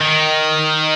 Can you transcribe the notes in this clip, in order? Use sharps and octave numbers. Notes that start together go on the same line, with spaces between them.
D#3